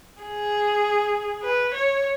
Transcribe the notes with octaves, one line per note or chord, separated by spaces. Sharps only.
G#4
B4
C#5